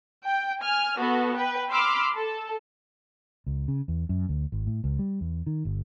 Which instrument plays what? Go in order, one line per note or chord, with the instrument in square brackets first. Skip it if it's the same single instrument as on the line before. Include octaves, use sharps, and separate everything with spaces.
[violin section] G5
G#5 F6
B3 F#4 A4
B4 G5
B5 C6 D6 E6 F6
A4
[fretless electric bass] C#2
C#3
E2
F#2
D2
G#1
A2
C#2
G3
E2
D#3
G1